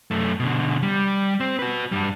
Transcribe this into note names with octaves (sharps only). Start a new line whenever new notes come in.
F#2 A3
B2 D3
G3
C4
F#4 B4
G2 G3